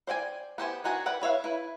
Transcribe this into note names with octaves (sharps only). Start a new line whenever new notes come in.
C5 D5 G5 G#5
B3 G4 C5 G#5
D4 D#4 F#4 G#5
B4 D5 F#5 G5
B4 C#5 E5 F5
E4 B4